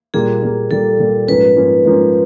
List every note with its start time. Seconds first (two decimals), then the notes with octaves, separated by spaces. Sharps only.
0.14 A#2 G3 A#3 G#4
0.42 A#2 G3 A#3
0.70 A#2 G3 A#3 A4
0.99 A#2 G3 A#3
1.28 G#2 F3 A#3 C#4 B4
1.57 G#2 F3 A#3 C#4
1.85 G#2 F3 A#3 C#4